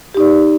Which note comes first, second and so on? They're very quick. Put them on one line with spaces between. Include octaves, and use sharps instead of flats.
G4 D#4 D5